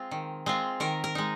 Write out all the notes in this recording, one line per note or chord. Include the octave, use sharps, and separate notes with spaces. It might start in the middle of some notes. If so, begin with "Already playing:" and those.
Already playing: G#3 C4 F4
D#3
G#3 C4 F4
D#3 A#4
A#4
G#3 D#4